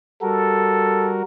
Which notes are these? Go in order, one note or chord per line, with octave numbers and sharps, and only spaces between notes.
G3 F#4 A4 A#4